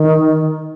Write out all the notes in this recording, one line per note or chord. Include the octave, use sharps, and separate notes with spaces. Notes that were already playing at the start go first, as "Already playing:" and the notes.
Already playing: D#3